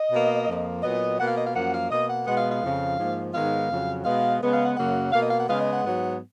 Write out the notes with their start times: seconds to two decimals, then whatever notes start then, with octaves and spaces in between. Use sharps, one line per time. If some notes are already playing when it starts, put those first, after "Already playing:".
Already playing: D#5
0.11 B2 A#3
0.46 F2 F3 A#3
0.82 A#2 F#3 B3 D#5
1.18 B2 A#3 F#5
1.28 F5
1.37 D#5
1.45 F5
1.54 F#2 F3 A#3 F#5
1.73 F5
1.90 B2 A#3 D#5
2.08 F#5
2.25 B2 G#3 B3 F#5
2.37 F5
2.50 F5
2.61 F2 C#3 F3
2.98 G#2 F3 A#3
3.33 G#2 D#3 G#3 B3 F5
3.68 F2 C#3 F#3
4.04 B2 G#3 B3 F5
4.40 C#3 G#3 B3
4.52 F5
4.64 F#5
4.76 F#2 C#3 F#3 A#3 F#5
5.12 B2 A#3 F5
5.21 D#5
5.30 F5
5.39 F#5
5.47 C#3 G#3 B3 F5
5.60 D#5
5.72 F#5
5.83 G#2 F#3 B3